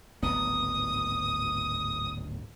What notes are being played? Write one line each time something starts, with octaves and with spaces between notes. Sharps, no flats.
D1 G#1 B3 D#6